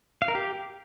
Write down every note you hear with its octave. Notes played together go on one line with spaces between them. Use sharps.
F5
A#4
G4